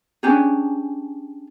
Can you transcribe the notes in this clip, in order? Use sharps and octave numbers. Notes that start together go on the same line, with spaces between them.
C#4 D4 G4 G#4